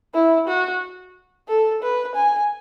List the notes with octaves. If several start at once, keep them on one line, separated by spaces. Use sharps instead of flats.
E4
F#4
A4
B4
G#5